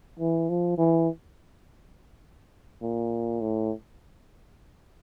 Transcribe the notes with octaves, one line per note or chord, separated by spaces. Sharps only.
E3
F3
E3
A#2
A2